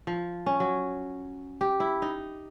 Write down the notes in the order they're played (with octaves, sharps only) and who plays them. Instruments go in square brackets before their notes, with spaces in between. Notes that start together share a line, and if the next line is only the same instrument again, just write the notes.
[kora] F3
C#4
F#3
G4
E4
D#4